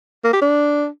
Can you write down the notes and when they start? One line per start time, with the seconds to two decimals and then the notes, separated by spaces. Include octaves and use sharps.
0.24 A#3
0.33 G4
0.42 D4